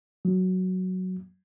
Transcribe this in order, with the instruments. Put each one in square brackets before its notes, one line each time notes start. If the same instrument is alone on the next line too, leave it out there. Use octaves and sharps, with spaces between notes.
[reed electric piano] F#3